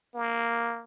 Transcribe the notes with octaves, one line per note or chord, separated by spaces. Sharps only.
A#3